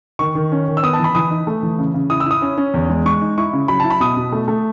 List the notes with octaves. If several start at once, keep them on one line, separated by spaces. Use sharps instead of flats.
D#3 C#6
D#3
C#4
D#3
E6
B3 D#6
A5
E3
B5
E3 D#6
D#4
A3
E3
C#3
C#3
E4 D#6
E6
E4 D#6
C#4
C#4
E2
G#3
G#3 C#6
D#4
E4 C#6
C#3
F#3 B5
E4 A5
B5
B2 D#6
B2
A3
A3